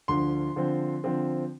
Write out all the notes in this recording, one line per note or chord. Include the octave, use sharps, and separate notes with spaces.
D2 D3 F3 C6
D3 F3 C4
D3 F3 C4